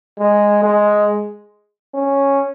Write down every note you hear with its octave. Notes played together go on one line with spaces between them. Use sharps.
G#3
G#3
C#4